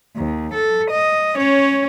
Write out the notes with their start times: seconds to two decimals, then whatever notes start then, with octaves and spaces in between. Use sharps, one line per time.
0.16 D#2
0.54 A4
0.91 D#5
1.36 C#4 C#5